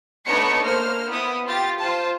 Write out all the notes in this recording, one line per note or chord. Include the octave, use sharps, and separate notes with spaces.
A3 B3 D4 D#4 C#5 C#7
A#3 C5 F6
B3 E4 D#6
F4 G4 A6
F4 C5 A5